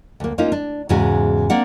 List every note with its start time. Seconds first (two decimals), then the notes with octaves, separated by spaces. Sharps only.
0.20 D2 A#3
0.38 A#3 C#4 D#4 F4
0.52 D4
0.89 E2 G#2 C#3 G#3 F#4 G#5
1.50 A#3 C4 D4 D5 F#5